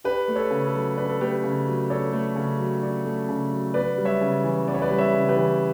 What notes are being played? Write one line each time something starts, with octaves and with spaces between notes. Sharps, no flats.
D4 G4 B4
A3
A4 C#5
C#3
A4
F#3
D4 B4
A4
A3 G4 B4
C#3
F#3
D4 A4 C#5
A3
C#3
F#3
D4
A3
C#3
F#3
B3 B4 D5
G3
C#5 E5
C#3
E3
B3 D5
C#5
B4 D5
G3
C#5 E5
C#3
G4 B4
E3